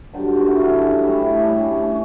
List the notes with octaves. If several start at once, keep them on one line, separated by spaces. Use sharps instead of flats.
G2 D3 F#3 G4
F#4
E4
G2 D3 F#3 C#4
D4
C#4
D4
A2 G3 C#4 E4
E4
D4
A2 G3 C#4 D4
C#4
D4
C#4